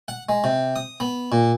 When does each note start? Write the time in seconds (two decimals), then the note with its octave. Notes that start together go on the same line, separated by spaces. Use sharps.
0.08 F#5
0.29 G#3
0.44 C3
0.76 D#6
1.00 B3
1.32 A#2